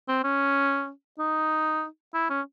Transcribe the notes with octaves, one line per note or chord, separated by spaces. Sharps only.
C4
C#4
D#4
E4
C#4